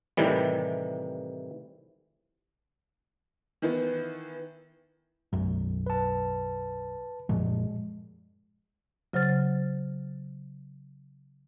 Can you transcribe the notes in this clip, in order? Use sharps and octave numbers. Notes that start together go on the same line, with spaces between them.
A2 C3 D#3 E3 G3
D#3 E3 B3
B1 F#2 F#3
B4 A5
F#2 A#2 F3 G#3
C#3 F#3 C5 F6 A6